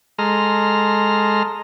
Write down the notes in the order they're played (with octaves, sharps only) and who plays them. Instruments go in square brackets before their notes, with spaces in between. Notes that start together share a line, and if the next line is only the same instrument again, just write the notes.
[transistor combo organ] G#3 A4 D#5 A#5 C6 F6